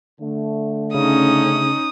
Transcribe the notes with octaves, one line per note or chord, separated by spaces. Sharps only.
D3 A3
C#3 C#4 D#4 D#6